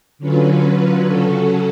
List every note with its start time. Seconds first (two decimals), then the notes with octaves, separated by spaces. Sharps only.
0.19 D3 F#3 C#4 F4 B4
1.06 C#3 F#3 C#4 F#4 A4